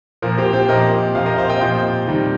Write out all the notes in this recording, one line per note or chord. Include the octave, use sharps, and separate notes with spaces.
A#2 F3 A#4
G4 C5
G4 C5
A#2 F3 A#4 D#5
A#2 F3 C5 F5
A#4 D#5
C5 F5
D#5 G5
A#2 F3 G5 C6
C3 D#3 G3